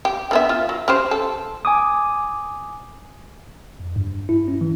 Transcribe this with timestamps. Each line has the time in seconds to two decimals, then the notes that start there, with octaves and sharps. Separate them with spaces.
0.05 G4
0.31 D3 B3 E5
0.49 F4
0.69 F#3
0.88 C#4 G4 C5
1.11 A4
1.65 G#5 D6 D#6
3.79 F2
3.96 G2
4.29 E4
4.48 C#4
4.61 E3